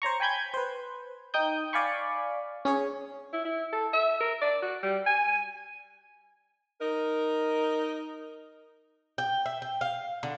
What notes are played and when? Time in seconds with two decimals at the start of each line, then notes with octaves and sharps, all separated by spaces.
0.02 C5 C#5 A#5 C#6
0.20 G5 G#5 B5 G6 G#6
0.54 B4 C5
1.34 D#4 G5 D#6 G6
1.73 D5 F5 G#5 B5 C#6
2.65 C#4 G#4 C#5
3.33 E4
3.45 E4
3.72 A4
3.93 E5
4.20 A#4
4.41 D5
4.62 F#4
4.83 G3
5.06 G#5
6.81 D#4 A#4
9.18 G5
9.46 E5
9.62 G5
9.81 F5
10.23 D3